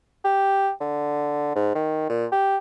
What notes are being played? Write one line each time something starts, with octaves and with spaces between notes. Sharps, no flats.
G4
D3
G#2
D#3
A#2
G4